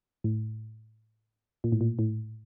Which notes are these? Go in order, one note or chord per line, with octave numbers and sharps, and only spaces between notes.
A2
A#2
A2
A#2
A2